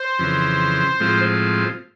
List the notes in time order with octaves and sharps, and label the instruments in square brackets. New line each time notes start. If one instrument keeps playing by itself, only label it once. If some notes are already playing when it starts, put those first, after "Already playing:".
Already playing: [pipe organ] C5
[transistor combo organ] F2 C#3 E3
A2 F3 G#3 C4 F4